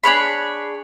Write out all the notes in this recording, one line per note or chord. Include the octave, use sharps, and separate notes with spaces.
D4 G#4 C#5 B5